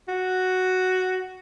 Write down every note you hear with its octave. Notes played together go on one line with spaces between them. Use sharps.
F#4